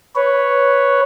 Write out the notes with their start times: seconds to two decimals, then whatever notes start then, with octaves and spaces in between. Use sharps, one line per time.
0.15 B4 C#5